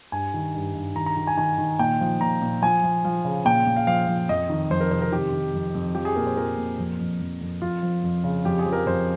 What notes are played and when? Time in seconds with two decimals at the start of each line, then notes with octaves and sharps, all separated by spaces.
0.12 G2 G#5
0.34 D#3
0.55 G2
0.75 G2
0.95 D#3 A#5
1.06 A#5
1.16 D#3
1.27 G#5
1.38 D#3 G#5
1.58 D#3
1.79 A#2 G5
2.01 F3
2.21 A#2 A#5
2.42 A#2
2.62 F3 G#5
2.83 F3
3.05 F3
3.25 C#3
3.45 A#2 G5
3.66 A#2
3.76 F5
3.87 F3 F5
4.08 F3
4.29 F2 D#5
4.49 D#3
4.70 F2 C5
4.81 A#4
4.91 C3 C5
5.02 A#4
5.12 D#3 G4
5.32 D#3
5.54 F2
5.74 F2
5.95 F3 G4
6.05 G#4
6.16 A#2 A#4
6.27 C5
6.36 F3 A#4
6.57 A#2
6.78 F2
6.99 F2
7.21 F2
7.41 F2
7.61 F2 F4
7.83 F3
8.03 F2
8.24 C#3
8.45 F2 G4
8.59 G#4
8.66 F3
8.73 A#4
8.86 F2 C5